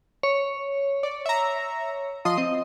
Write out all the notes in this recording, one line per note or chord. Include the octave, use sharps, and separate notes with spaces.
C#5
D5
E5 A#5
F3 D#5 C6 D#6
C4 D#5